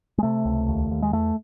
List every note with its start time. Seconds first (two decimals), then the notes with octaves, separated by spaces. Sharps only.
0.18 G#3
0.23 C3 A3
0.45 C#2
0.69 D#2
0.91 D#2
1.02 G#3
1.13 E2 A3